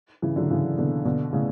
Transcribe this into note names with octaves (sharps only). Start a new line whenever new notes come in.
C#3 E3
D3 F#3
C#3 E3
B2 D3
B2 D3
A2 C#3